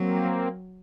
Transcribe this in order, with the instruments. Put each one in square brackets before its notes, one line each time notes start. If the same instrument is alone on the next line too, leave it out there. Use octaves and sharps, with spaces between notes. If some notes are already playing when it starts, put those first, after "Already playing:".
Already playing: [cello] F#3 [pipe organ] A#3 C4